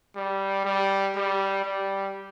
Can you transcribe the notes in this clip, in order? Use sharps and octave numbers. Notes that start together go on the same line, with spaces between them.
G3
G3
G3
G3